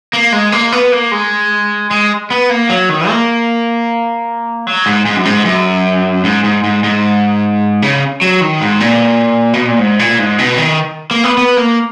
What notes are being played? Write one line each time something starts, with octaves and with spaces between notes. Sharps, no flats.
A#3
G#3
A#3
B3
A#3
G#3
G#3
B3
A#3
F#3
D#3
A#3
F#3
G#2
G#2
F#2
G#2
F#2
G#2
G#2
G#2
G#2
C#3
F#3
D#3
G#2
A#2
B2
A#2
G#2
A#2
G#2
B2
D#3
A#3
B3
B3
A#3